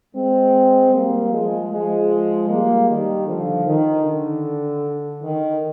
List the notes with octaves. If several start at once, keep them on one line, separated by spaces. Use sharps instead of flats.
G#3 C4
G3 A#3
F3 G#3
F3 G#3
G3 A#3
D#3 G3
D3 F3
D#3
D3
D#3